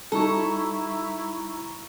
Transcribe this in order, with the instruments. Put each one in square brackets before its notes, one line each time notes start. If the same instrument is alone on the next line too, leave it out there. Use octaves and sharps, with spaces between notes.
[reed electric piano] G3 D#4 F#4 [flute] E4 [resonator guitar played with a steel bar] A4 [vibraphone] A#5 C#6